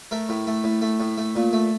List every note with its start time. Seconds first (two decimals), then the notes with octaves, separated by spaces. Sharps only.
0.11 A3 A#4
0.29 A2
0.47 A3
0.64 A2
0.82 A3
1.00 A2
1.18 A3
1.36 A#2
1.53 A3